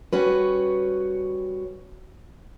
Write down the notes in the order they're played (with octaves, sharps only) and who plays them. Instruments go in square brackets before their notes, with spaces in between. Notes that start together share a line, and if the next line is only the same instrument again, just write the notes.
[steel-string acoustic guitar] G3 C#4 F#4 B4